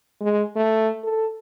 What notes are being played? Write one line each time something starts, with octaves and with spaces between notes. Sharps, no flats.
G#3
A3
A4